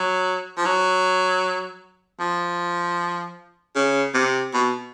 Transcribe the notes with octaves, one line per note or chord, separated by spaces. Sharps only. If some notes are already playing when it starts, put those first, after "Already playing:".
Already playing: F#3
F3
F#3
F3
C#3
C3
B2